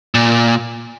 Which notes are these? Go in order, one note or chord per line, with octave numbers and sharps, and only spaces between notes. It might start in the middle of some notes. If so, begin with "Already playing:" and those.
A#2